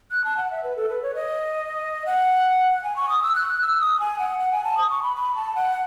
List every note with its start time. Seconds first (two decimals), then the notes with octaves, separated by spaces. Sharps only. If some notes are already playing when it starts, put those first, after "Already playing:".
0.11 F#6
0.25 A5
0.37 F#5
0.51 E5
0.64 B4
0.77 A4
0.89 B4
1.02 C#5
1.15 D#5
2.06 F#5
2.84 G#5
2.96 C#6
3.09 D#6
3.23 E6
3.35 F#6
3.49 F#6
3.61 E6
3.81 D#6
4.00 G#5
4.19 F#5
4.39 F#5
4.52 G#5
4.64 A5
4.77 D#6
4.90 C#6
5.03 B5
5.16 B5
5.35 A5
5.55 F#5